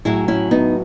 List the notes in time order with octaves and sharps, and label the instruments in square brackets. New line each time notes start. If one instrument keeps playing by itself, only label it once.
[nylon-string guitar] A2 F#3 E4 G#4
C#4 E4
B3 D#4